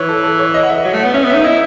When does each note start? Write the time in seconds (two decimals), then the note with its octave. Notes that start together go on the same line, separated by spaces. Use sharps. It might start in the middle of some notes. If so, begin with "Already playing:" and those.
Already playing: E3 C#5
0.09 A4
0.23 A4
0.39 C#5
0.54 D#5
0.63 F#5
0.69 E5
0.85 F#3 E5
0.93 A3
0.99 B3 F#5
1.14 C#4 E5
1.24 B3
1.30 D#4 E5
1.44 E4 D#5